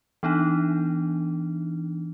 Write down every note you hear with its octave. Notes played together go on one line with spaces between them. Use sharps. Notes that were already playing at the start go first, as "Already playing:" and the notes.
E3 B3 D4 D#4